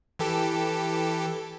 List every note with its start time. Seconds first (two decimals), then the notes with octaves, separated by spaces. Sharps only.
0.19 E3 G4 A4